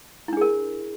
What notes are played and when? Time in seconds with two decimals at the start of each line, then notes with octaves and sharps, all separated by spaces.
0.28 E4
0.33 D4
0.37 G#4
0.41 A#4